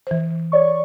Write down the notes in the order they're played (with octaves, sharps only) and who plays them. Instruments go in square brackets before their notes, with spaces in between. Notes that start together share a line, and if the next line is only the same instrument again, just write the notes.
[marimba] E3 C5
[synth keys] C#5 D5 C#6